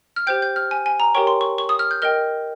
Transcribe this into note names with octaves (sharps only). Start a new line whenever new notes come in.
F6
G4 C5 G5 G6
G6
F6
G#5
G#5
A#5
G4 A#4 C#5 G5 C#6
C6
C#6
C#6
D#6
F6
G6
A#4 D#5 G5 F6